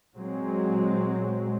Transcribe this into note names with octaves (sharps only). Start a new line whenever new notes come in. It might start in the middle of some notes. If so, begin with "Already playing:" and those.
A#2 F#3 G#3 C4